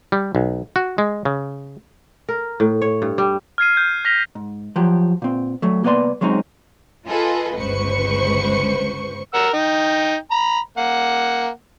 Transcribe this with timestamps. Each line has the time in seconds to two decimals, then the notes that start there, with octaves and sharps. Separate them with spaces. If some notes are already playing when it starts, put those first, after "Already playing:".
0.12 G3
0.35 B1
0.76 F#4
0.98 G#3
1.25 C#3
2.29 A#4
2.60 A2
2.82 C#5
3.02 G2
3.18 G3
3.58 F6 G#6 C7 D#7
3.77 G6
4.05 F6 A#6 B6 F7 G7
4.35 G#2
4.76 F3 F#3 G4
5.22 A#2 C4
5.62 F#3 A3
5.83 C2 A#3 B3 B4 D5 C6
6.21 F#3 G#3 C4 C#4 D#4
7.08 F4 G#4 A4 B4 D#5
7.56 G1 C#2 B4 C5 C#6 C#7
9.34 A#4 F#5 E6
9.53 D#4 G5
10.31 A#5 B5
10.78 A#3 F#5